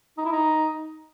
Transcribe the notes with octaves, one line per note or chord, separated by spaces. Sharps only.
D#4
E4
D#4